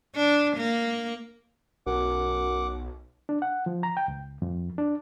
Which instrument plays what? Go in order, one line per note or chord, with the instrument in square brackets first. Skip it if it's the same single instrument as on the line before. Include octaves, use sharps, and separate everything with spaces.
[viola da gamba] D4
A#3
[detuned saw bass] B1 [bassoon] F#2 [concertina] F#5 D6
[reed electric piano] D4
F#5
F3
A#5
G5
C#2
F2
D4